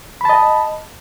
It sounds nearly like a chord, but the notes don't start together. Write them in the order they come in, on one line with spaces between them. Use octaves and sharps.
B5 A5 D#5